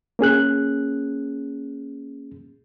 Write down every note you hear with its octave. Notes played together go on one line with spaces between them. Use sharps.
A#3 C#4 G#4 F#6